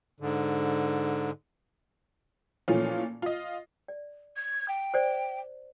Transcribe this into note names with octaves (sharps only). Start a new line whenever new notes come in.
G#2 D3
A#2 E3 F3 A3 C#4 F4
F4 D#5
D5
G#6
G5
C5 D5